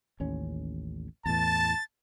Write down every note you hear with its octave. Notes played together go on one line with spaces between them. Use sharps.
A1 D#2 C#4
E2 A2 E3 A5 A6